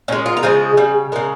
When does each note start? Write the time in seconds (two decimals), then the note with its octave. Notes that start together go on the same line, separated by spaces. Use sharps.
0.08 A#2 G#3 C#4
0.26 F4
0.37 A#4
0.43 C#3 F3 G#3 G#4
0.77 C#3 G3
1.12 C#3 G#3 A#4